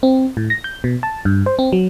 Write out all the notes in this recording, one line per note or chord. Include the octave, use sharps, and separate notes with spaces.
C4
A2
A#6
G6
B2
A5
G2
C5
C4
F#3